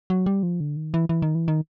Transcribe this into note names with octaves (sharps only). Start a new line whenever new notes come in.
F#3
G3
F3
D3
D#3
E3
E3
D#3
E3
D#3